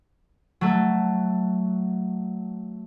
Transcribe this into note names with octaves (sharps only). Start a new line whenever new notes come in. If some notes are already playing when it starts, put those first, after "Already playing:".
F#3 A3